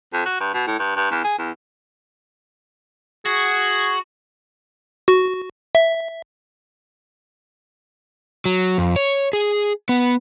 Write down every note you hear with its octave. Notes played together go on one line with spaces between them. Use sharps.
F2
F#4
G2
B2
A2
G2
G2
E2
G#4
E2
F#4 G#4
F#4
E5
F#3
F2
C#5
G#4
B3